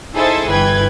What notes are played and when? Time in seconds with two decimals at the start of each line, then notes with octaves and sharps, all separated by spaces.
0.15 D#4 E4 G#4 A4 C5 E5
0.49 G1 E3 B4 G5 G#6